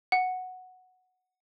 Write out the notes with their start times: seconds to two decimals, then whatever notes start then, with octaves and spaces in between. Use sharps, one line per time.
0.12 F#5